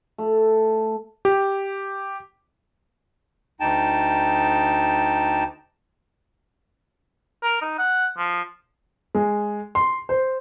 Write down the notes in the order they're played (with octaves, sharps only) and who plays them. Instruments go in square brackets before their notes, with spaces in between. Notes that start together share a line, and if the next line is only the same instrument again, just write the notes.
[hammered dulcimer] A3
[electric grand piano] G4
[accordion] D2 D#4 G5 A5
[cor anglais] A#4
D#4
F#5
F3
[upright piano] G#3
C6
C5